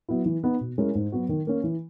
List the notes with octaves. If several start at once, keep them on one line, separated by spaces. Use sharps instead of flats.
F#3 B3 E4
E3
B3 D#4
B2
G#3 C#4 E4 A#4
G#2
F#3 B3 F#4
D#3
A#3 C#4
E3